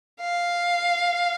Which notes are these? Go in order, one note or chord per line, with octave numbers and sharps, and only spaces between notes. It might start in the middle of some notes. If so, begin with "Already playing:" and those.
F5